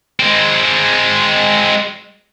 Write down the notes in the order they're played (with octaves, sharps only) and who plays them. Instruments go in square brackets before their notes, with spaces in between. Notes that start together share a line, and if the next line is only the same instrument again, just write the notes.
[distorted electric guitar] G#3 C4